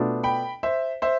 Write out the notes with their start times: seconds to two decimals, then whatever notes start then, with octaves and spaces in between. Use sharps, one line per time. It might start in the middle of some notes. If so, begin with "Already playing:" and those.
Already playing: B2 A3 D4 F4 A4
0.24 G5 B5
0.63 C5 E5
1.02 C5 E5